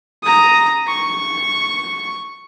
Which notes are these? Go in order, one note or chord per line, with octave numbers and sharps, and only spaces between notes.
A#5 D#6
C#6